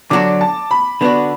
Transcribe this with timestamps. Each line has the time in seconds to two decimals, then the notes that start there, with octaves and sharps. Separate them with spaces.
0.10 D3 F#3 D4 F#4 D6
0.41 A5
0.71 B5
1.01 D3 B3 D4 F#4